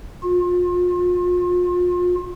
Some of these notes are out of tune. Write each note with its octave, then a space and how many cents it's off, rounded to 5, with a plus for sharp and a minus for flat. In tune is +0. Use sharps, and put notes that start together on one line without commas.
F4 +35